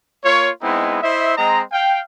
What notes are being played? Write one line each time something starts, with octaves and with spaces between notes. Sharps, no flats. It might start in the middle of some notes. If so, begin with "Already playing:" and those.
A#3 F4 C#5
G#3 B3 C4 D#4 E4
E4 C5 D#5 E5
G#3 C4 D#5 A#5
F5 G5